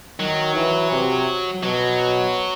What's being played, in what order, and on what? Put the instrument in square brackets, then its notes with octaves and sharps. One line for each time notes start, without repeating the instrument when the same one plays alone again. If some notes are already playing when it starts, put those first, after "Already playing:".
[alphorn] D#3 [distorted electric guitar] F#3
[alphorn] E3
C3
[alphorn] B2 [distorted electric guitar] F#3